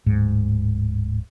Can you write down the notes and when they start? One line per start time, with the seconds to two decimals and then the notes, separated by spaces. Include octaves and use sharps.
0.06 D1 G#2